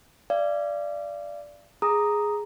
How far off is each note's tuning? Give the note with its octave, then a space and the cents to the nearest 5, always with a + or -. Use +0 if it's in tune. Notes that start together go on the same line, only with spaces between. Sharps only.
D5 +0 F5 -35
G#4 +0 A#5 +0 D#6 +0